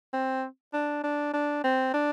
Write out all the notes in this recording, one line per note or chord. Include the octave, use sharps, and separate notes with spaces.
C4
D4
D4
D4
C4
D4